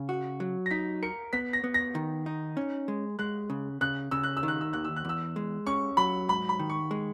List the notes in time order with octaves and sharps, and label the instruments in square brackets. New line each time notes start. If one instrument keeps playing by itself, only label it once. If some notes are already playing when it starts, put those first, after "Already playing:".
Already playing: [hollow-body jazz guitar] C#3
F#4
F#3
[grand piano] A#6
[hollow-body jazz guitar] D#4 [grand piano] B6
[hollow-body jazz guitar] A#4 [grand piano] C#7
[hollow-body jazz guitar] B3 [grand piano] B6
[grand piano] A#6
[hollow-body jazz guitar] B3
[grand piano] A#6
[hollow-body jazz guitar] D#3
D#4
C#4
G#3
[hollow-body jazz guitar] G#3 [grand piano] F#6
[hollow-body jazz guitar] C#3
[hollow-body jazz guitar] C#3 [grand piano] F#6
[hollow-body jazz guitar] C#3 [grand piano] E6
[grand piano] F#6
E6
[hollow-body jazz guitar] D#3
[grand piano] F#6
E6
[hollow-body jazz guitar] D#2 [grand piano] F#6
[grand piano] E6
F#6
[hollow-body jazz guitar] E2 [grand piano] E6
[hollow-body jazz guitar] G#3
[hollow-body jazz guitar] C#4 [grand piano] C#6
[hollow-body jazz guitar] F#3 [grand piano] B5
[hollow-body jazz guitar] G#2 [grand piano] B5
[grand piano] B5
[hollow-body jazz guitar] D#3
[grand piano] C#6
[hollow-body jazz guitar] G#3